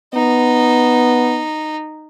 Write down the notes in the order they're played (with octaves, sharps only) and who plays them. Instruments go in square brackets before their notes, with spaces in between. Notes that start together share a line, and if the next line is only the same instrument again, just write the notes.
[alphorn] B3 [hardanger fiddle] D#4